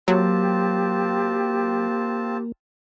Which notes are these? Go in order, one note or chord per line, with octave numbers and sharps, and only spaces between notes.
F#3 A#3 C4 F4 G4 A5